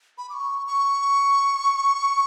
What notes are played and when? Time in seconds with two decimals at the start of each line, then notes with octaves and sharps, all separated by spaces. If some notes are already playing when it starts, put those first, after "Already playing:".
0.18 B5
0.29 D6
0.34 C#6
0.66 C#6